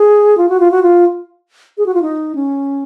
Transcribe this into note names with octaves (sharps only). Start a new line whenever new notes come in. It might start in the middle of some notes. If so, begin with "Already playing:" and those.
Already playing: G#4
F4
F#4
F4
F#4
F4
G#4
F#4
F4
D#4
C#4